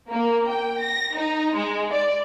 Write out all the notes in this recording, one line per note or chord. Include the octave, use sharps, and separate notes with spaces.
A#3
G5
A#6
D#4
G#3
D5